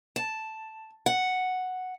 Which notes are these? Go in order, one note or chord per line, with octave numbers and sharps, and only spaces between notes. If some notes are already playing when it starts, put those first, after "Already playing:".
A5
F#5